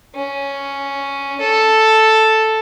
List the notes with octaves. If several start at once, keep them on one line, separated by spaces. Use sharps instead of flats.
C#4
A4